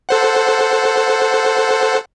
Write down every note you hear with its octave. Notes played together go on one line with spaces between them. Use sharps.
A4 C5 F#5